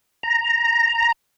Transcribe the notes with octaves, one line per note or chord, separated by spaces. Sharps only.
A#5